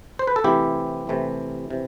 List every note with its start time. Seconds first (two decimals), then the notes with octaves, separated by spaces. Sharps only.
0.19 C5
0.27 B4
0.36 A4
0.44 C3 E3 A3 C4 E4 G4
1.07 C3 E3 A3 C4
1.70 C3 E3